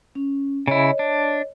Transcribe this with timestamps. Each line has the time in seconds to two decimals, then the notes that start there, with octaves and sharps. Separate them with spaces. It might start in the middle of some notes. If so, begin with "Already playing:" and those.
0.15 C#4
0.67 C#3 E4 C#5 D#5
0.99 D4